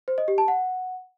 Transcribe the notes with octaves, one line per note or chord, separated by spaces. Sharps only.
C5
D#5
G4
A5
F#5